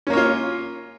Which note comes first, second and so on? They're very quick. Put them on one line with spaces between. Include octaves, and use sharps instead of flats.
C#4 A#3 C#5 F4